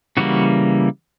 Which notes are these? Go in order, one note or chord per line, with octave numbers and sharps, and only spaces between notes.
C#3 E3 G3 A#3 F#4